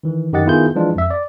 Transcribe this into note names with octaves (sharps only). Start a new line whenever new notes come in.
D#3 E3
F#2 D#3 G4 D#5 F#5 A6
D#3 B3 E4 F4 G#4 G6
E3 F3 G#3 D4 F4
F2 E5
D5